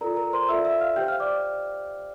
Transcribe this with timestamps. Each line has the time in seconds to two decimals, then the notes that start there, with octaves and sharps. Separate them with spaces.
0.01 F4 A4 A#4 D5 A#5
0.16 A#4 A#5
0.33 C5 C6
0.49 F4 A4 D5 E5 E6
0.65 E5 E6
0.81 F5 F6
0.96 G4 C5 G5 G6
1.08 F5 F6
1.20 D5 D6